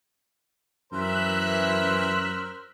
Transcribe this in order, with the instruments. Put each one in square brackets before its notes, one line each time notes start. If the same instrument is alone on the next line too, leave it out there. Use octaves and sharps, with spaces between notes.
[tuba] F#2 [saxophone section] E3 [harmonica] A#4 C5 [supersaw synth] E6 F#6 B6